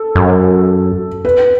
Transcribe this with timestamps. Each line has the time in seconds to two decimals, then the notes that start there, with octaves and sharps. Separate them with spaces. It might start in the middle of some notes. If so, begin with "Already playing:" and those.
Already playing: A4
0.15 F#2
1.25 B4